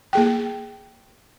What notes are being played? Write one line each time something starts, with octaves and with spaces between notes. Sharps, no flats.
A#3 G#4 G5